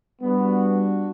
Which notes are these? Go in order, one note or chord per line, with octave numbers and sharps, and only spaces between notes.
G3 B3 D4 F#4